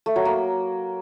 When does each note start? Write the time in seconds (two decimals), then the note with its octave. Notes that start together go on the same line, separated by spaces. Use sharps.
0.06 A3
0.16 F#3
0.25 A#3